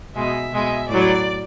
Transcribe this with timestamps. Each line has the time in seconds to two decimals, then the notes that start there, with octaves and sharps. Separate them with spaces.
0.15 B2 G#3 E5
0.52 B2 G#3
0.89 A2 F#3 D5